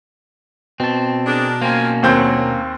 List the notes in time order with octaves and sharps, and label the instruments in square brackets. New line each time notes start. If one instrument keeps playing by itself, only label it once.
[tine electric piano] B2 A5 [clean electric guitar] C4
[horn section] D4 G#4 A#4
[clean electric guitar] A#3 C#4 [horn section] C4 F4 G#5
[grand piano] D#2 C4 G6 [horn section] F#3